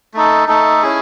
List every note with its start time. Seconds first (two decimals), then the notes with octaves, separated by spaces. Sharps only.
0.14 A3 D#4 A4
0.48 A3 D#4 A4
0.83 C#4 E4 G#4